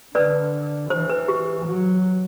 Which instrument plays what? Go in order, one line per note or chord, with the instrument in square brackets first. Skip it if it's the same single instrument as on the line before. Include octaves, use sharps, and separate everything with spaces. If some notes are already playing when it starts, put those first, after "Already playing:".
[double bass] D3 [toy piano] B4 D5
[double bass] E3 [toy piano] C5
[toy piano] B4
G4
[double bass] F#3